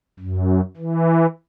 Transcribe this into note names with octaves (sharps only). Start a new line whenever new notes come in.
F#2
E3